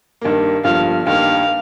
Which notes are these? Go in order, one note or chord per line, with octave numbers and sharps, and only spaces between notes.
G2 D#3 A#3
G1 G2 F3 F5
G2 D#3 G3 A#3 F5